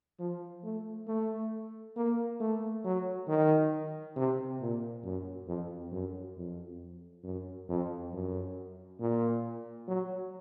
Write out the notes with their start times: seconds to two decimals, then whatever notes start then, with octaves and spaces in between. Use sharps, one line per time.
0.20 F3
0.64 A3
1.08 A3
1.97 A#3
2.40 A3
2.85 F#3
3.28 D#3
4.16 C3
4.61 A#2
5.04 F#2
5.48 F2
5.92 F#2
6.37 F2
7.24 F#2
7.69 F2
8.13 F#2
9.00 A#2
9.88 F#3